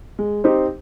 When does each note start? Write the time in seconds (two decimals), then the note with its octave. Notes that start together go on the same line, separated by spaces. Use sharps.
0.19 G#3
0.44 C4 D#4 G4 C5